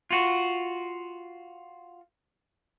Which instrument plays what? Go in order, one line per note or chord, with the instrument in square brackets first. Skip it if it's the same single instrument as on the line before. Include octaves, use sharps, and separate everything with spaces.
[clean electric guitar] F4 F#4